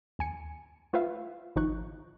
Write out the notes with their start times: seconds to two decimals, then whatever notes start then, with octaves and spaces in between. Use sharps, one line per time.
0.19 D#2 G#5 C#7
0.93 A3 F4 B4 C5 E5 F5
1.56 G#1 F3 D#4 C#6 F#6